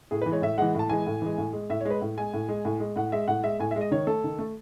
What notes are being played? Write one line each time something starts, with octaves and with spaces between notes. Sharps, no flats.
A2 G#4
B4
E3
G#3 C#5
A2 E5
E3 G#3 F#5
A2 A5
E3 G#3 G#5
A2
E3 G#3
A2
G#3
A2 E5
C#5
G#3
B4
A2
G#3 G#5
A2
G#3
A2
G#3
A2 F#5
G#3 E5
A2 F#5
G#3 E5
A2 G#5
E5
G#3
D#5
D#3 C#5
A3 A4
D#3
A3